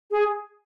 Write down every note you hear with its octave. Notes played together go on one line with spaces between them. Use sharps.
G#4